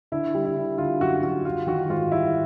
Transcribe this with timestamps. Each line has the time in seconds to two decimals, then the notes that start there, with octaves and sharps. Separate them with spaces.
0.12 D3 E4
0.35 G3
0.45 E4
0.57 D3
0.78 D3 F4
1.00 F#2 F#4
1.22 F#2 F#4
1.45 G3 F4
1.67 D#3 F#4
1.90 G#2 F4
2.12 G3 E4